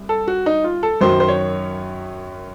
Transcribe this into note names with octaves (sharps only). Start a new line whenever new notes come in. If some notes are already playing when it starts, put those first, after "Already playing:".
Already playing: C2
A4
F#4
D#4
F4
A4
F#2 D#3 F#3 C5
C5
C#5